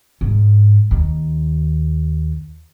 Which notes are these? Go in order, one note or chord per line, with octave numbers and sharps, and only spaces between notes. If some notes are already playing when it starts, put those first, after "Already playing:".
G#2
D#2